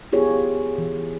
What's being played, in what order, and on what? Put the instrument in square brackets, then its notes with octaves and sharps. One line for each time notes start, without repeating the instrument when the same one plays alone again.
[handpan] B3 F4 G4 G#4 C#5
E3